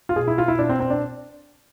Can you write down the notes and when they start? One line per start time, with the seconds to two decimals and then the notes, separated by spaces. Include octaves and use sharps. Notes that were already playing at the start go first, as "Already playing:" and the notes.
0.09 F4
0.16 B2 G#4
0.28 E4
0.38 F4
0.48 E4
0.58 B2 D4
0.69 C4
0.80 C4
0.90 D4